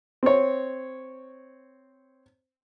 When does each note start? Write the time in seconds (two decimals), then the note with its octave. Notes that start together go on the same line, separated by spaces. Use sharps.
0.23 C4 C#5